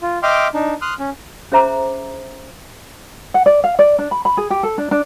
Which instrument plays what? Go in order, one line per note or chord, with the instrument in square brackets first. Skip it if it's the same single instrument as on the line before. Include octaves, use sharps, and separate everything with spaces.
[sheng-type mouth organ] F4
D#5 E5 G5 C6 D6 F6
D4 D#4
C6 D#6 F6 F#6
C#4
[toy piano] C#4 G#4 C5 E5 A#5 D6
[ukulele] F#5
D5
F5
D5
D4
B5
B5
G#4
G4
A4
D4
D4